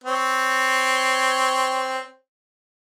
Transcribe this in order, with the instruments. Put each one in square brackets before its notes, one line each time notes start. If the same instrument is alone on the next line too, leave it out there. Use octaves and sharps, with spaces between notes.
[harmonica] C4 C#5